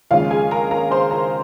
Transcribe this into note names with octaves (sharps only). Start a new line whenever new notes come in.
D#2 C#3 F3 G#3 C#4 F4 F5
G#4 G#5
A#4 A#5
A#4 A#5
C5 C6
A#4 A#5